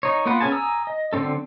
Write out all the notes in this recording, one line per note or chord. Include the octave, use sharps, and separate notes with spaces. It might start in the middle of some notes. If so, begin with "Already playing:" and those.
D#4 C#5
A#3 B3 F4 B4 F#5
B3 C#4 G#4 G#5 A5
G#5 A#5 D#6 E6
D#5
D3 F#3 C4 C#4 A4